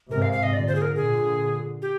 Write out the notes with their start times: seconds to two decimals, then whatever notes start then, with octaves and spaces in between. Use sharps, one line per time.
0.11 G#2 C3 A#4
0.22 F5
0.32 F5
0.43 D#5
0.53 A#2 D3 D5
0.68 C5
0.75 G#4
0.82 A#4
0.96 A#2 D3 G#4
1.82 G4